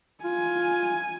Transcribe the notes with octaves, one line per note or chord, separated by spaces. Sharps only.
F4 G#5